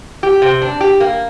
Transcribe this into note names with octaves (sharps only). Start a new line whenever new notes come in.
G4
C3
D4
G4
A#3